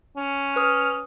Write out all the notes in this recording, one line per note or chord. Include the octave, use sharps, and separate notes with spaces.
C#4
B4 D#6 F6